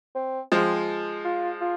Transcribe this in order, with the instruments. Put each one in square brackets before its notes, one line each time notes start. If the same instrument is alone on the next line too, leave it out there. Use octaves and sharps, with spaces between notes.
[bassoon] C4
[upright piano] F3 G#3 [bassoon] C4
[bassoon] F4
F4